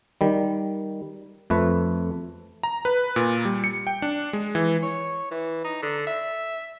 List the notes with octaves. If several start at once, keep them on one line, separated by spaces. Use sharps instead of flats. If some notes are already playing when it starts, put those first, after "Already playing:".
D#3 G3
F2 A3 B4
A#5
B4
A#2
G3
C#7
G5
D4
G#3
E3
C#5
E3
D#4
D3
E5